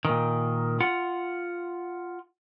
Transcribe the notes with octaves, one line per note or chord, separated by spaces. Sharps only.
A#2 D#3
F4 F#5